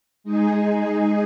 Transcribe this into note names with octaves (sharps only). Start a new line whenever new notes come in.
G#3 D#4 G#4